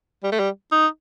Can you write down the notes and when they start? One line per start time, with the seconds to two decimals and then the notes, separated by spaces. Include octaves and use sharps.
0.23 G3
0.32 A3
0.39 G3
0.72 D#4